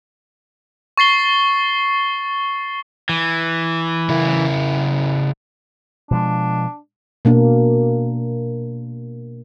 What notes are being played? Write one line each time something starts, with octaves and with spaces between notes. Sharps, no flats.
C#6 A6 C7 G7
E3
C#3 E4 A#4
B2 F3 G#3 D4
B2 A#3 D4